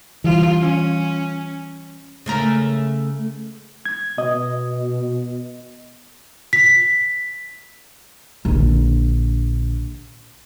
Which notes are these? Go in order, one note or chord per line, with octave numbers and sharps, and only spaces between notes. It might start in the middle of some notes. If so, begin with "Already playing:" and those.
E3 G3 F4
C#4
C#3 A3 A#4
G#6
B2 D#5
B6
A#1 D3